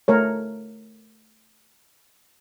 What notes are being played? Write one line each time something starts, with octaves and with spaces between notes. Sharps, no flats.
A3 A#4 C#5